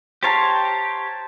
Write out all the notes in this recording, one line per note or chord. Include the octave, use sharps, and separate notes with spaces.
G4 C5 C#5 F5 A5 A#5